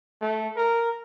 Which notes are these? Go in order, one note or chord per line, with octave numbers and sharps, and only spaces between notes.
A3
A#4